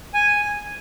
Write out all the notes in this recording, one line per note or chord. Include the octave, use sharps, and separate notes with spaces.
G#5